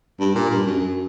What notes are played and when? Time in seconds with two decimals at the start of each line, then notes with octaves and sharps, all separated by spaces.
0.20 G2
0.35 A#2
0.50 G2
0.66 F#2
0.80 F#2